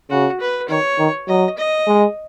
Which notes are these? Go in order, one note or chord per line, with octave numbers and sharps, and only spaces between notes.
C#3 F#4
B4
D#3 C#5
D#3
F#3 D#5
D#5
G#3